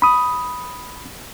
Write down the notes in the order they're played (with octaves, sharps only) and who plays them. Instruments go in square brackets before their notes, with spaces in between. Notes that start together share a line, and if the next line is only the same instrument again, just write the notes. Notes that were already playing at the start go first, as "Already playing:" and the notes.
[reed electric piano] B5 D#6